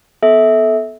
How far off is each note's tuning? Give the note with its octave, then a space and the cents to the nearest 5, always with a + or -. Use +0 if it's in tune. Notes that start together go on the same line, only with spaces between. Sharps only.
B3 +0 A4 -20 E5 -20